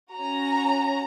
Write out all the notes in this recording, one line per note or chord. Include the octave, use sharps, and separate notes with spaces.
C#4 F#4 A#5